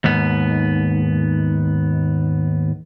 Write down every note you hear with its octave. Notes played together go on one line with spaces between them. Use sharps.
D#2 G#2 B3